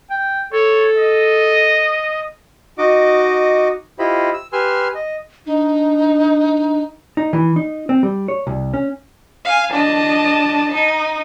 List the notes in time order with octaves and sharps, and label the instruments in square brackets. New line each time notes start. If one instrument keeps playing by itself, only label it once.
[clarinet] G5
[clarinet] A4 [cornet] C#5
[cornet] D#5
[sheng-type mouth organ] D#4 F#4 D#5 D6
E4 F4 G4 C5 D#5 B5
E6
G4 B4 G#5 C6 E6 F6
D#5
[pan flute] D4 [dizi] D#4
[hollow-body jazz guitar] D#4
E3
D#4
C4
G3
C#5
C2
C#4
[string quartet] F5 G#5
[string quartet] D4 D#5 [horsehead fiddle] A5
[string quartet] D#4